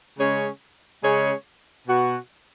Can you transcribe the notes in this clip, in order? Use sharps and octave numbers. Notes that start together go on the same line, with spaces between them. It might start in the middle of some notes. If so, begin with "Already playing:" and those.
C#3 G#3 C#4 G#4 C#5
C#3 G#3 C#4 G#4 C#5
B2 B3 F#4